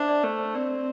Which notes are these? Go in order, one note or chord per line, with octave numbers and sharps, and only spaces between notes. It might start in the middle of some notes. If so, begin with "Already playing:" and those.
Already playing: D4 C5 E5
D5
A3 C5
C5
C4 D5